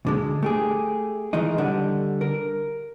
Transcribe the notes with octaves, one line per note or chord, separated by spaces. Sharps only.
D2 D3 G#3
A3 G4 G#4
D#3 E3 G#3 D#4
D3 G3 F#5
A#4